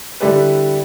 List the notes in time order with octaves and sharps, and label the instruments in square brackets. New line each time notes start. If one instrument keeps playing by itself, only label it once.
[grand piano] D3 G3 E4 G4 A4 B4